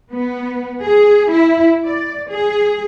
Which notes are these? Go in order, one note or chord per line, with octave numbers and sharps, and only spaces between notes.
B3
G#4
E4
D5
G#4